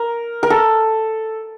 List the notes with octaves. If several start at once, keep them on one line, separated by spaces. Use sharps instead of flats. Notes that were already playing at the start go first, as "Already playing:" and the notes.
Already playing: A#4
A#4
A4